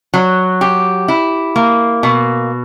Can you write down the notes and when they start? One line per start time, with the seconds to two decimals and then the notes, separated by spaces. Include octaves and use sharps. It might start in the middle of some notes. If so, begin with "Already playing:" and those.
0.14 F#3
0.61 G4
1.08 E4
1.56 A#3
2.03 B2